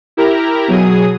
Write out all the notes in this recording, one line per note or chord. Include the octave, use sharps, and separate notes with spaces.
E4 G4 A#4 A#5
B2 F#3 G#4 D#6